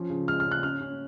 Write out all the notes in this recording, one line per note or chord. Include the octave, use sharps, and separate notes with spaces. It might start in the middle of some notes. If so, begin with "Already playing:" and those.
Already playing: F3 C#4
C#3
G#3 F6
F6
C#3
F#6
C#4 F6
C#4